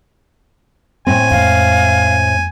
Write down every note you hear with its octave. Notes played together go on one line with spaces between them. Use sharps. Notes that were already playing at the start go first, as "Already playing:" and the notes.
A2 C4 G#5
F2 G#3 F5